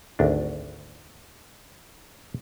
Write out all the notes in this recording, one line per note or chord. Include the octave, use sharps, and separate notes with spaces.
G#1 D2 D4